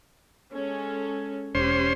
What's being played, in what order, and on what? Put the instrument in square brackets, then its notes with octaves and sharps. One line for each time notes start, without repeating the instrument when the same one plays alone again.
[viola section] G#3 C#4 A4
[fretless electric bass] E1 [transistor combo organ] C#4 C5 C6 [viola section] G4